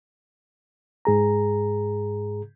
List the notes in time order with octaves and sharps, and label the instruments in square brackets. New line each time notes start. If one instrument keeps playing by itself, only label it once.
[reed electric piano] G#2 G#4 A#5